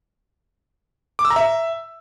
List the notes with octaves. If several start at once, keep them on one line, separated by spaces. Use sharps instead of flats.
D6
E6
A#5
E5